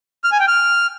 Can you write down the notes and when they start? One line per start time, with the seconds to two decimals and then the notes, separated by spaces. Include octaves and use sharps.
0.24 F6
0.32 G#5
0.40 G5
0.48 F6